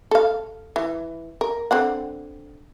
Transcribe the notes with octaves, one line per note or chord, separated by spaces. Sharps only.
A4 F5
E3
A#4
D3 C4 F#5